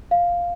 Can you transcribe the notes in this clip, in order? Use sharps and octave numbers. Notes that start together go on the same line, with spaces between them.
F5